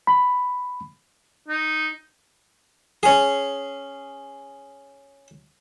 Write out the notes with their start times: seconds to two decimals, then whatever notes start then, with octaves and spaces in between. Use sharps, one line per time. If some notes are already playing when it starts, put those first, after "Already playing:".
0.07 B5
1.48 D#4
3.03 C#4 G#4